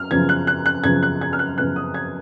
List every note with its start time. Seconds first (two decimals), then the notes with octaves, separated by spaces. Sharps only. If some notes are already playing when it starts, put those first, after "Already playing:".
Already playing: F#2 F6
0.11 F#2 C#3 F3 B3 G#6
0.29 F#6
0.47 F#6
0.66 F#6
0.84 F#2 C#3 F3 B3 G#6
1.03 F#6
1.21 G#6
1.33 F6
1.39 F#6
1.58 F#2 C#3 F3 B3 F#6
1.76 D#6
1.94 G#6